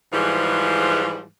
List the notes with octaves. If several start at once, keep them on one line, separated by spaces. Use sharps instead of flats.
G#2 E3 F3 G3 G#3